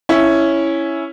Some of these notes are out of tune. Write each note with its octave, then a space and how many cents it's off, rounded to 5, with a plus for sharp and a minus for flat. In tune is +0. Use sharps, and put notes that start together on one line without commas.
C#4 +0 E4 +0